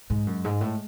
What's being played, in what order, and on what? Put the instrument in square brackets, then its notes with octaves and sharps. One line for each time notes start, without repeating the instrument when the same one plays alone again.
[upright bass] G#2 [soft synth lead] G#3
[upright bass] F#2
G#2
A2